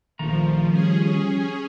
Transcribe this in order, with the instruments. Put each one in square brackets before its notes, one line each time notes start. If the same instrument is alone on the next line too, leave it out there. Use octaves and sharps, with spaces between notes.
[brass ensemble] A#1 [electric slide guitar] D#3 A3 A#5 [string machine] F3
[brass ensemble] F3 G3 [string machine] C#4 G#4